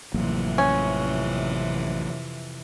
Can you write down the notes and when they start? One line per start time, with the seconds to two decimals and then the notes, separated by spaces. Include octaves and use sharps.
0.14 A1 F2 C3 E3 F#3 A#3
0.58 C#4